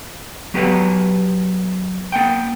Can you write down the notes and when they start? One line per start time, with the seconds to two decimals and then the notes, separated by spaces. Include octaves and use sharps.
0.54 F#3 B3 G4 B4 F#5
2.12 A#3 F#5 G5